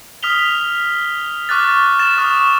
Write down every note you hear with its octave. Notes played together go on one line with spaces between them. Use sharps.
D#6 F6 B6 F7 G7
C#6 D6 F6 F#6 A6
A6 E7
C#6 D#6 F6